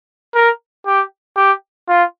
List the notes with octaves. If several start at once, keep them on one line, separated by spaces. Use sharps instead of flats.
A#4
G4
G4
F4